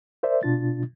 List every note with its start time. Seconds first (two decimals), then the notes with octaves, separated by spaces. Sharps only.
0.23 A#4 C5 D5 E5
0.43 B2 D4 F4 A6